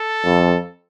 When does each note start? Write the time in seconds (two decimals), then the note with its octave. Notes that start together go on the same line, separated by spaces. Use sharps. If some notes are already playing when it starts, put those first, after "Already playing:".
Already playing: A4
0.25 F2